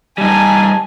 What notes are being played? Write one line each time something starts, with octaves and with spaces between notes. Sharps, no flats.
G3 D#4 G#5 A5